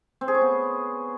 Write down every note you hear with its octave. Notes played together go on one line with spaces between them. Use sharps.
C4
G#4
C#5
B3